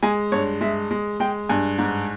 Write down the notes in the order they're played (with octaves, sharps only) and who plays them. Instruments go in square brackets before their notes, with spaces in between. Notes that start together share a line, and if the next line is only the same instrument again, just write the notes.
[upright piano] G#3 G#5
G2 C#5
G#3 E5
G#3
G#3 G5
G2 G#5
G#2